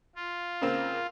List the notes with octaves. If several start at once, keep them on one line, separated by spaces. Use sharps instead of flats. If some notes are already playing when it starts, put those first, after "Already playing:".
F4
C#3 A#3 C4